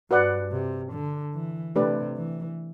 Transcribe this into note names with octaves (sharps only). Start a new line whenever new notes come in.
G2 F#4 B4 D5 F#5
C3
D3
E3
C3 A3 D4 G4 B4 D5
E3